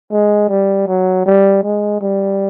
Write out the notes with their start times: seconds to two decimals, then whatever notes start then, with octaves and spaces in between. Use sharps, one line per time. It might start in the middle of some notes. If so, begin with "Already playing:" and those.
0.12 G#3
0.49 G3
0.87 F#3
1.26 G3
1.63 G#3
2.01 G3